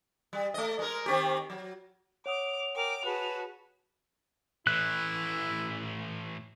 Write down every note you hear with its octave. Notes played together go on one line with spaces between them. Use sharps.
G3
A3 D#5
G#3 A#4
D#3 C4 G4
F#3
C#5 F#5 D6 D#6 F7
A#4 G5 G#5 D6
F#4 G#4 B4 A5
A2 E3 E4 F#6